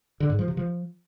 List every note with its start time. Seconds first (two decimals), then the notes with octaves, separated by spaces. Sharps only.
0.20 D3
0.30 G#2
0.39 F3
0.48 C3
0.57 F3